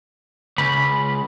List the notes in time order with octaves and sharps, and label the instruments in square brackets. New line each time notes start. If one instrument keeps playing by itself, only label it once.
[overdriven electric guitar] C#2 [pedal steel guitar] B5